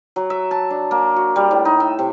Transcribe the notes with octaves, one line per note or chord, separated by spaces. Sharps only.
F#3
E5
A5
D4
A#3
F#4
G3
A2
D#4
E5
C3